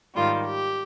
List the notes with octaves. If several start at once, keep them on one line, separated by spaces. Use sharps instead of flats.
G#2 D#3 G3 F4
G4